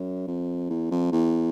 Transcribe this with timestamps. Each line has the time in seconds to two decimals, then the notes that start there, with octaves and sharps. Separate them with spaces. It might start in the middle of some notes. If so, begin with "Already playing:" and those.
Already playing: F#2
0.28 F2
0.70 E2
0.91 F2
1.12 E2